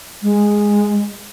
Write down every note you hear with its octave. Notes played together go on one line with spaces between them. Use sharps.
G#3